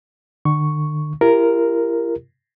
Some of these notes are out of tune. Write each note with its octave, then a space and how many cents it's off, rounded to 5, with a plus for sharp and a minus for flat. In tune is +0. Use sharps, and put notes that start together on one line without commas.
D3 +45 C#6 +0
E4 +45 G4 +15 A#4 +0